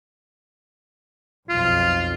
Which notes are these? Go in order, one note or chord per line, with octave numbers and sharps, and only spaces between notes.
B1 F2 F4